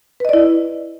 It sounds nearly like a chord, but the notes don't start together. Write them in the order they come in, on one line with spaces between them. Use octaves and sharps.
B4 D#5 D5 E4